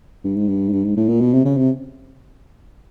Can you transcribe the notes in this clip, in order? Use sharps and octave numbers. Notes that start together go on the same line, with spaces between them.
G2
G#2
G2
G#2
G2
G#2
A2
A#2
B2
C3
C#3
C3